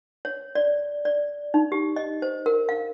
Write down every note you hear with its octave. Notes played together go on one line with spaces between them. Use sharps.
C#5
D5
D5
D#4
G4
D#5
C5
A#4
F5